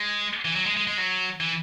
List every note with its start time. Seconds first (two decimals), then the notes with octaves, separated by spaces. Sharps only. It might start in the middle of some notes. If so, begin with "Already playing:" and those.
Already playing: G#3
0.45 E3
0.56 F#3
0.66 G#3
0.77 G#3
0.87 G#3
0.98 F#3
1.40 E3